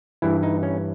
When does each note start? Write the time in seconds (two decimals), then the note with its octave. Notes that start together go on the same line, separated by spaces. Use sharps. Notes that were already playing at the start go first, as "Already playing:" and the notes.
0.22 G2 E3 E4
0.43 D#4
0.63 C#4